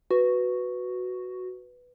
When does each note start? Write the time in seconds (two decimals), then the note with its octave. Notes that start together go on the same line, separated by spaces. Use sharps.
0.11 F#4 B4